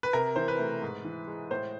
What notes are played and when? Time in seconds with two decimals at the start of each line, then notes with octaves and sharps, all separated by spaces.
0.03 B4
0.13 C3 A#4
0.36 E3 C5
0.48 B4
0.59 A3
0.82 G#2
1.04 E3
1.27 G#3
1.51 A2 C5